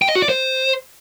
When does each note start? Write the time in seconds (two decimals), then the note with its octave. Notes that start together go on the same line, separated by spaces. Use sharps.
0.02 G5
0.09 D#5
0.15 F#4
0.22 D5
0.29 C5